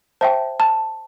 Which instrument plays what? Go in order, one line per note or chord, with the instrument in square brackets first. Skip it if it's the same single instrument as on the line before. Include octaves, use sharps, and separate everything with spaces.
[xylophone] C5 E5 G5 A5
A5